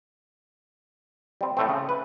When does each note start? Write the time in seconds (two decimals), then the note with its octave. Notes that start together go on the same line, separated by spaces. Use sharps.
1.41 G3 C4
1.57 A2 A3 C4
1.69 C#3
1.89 B4